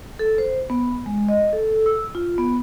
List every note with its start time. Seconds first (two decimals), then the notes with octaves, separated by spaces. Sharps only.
0.19 A4
0.38 C5
0.70 B3
1.06 G#3
1.29 D#5
1.53 A4
1.86 E6
2.15 F4
2.38 B3